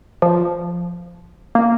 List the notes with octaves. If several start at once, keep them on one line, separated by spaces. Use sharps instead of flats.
F3
A#3